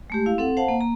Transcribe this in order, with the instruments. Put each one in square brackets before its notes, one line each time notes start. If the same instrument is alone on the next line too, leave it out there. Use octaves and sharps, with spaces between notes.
[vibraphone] G#3 A3 G4
E4 F5
C4 A4 F#5
C5 F5 F#5 A5
A#3
A#3 A#5